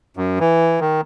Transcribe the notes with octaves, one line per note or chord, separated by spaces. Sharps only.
F#2
E3
D#3